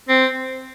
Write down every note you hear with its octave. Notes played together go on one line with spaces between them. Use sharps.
C4